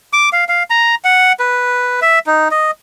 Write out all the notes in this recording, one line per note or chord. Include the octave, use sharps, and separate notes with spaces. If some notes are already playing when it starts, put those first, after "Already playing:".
D6
F5
F5
A#5
F#5
B4
E5
D#4
D#5